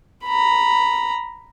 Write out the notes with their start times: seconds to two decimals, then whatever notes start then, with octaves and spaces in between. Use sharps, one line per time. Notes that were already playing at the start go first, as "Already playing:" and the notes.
0.24 A#5 B5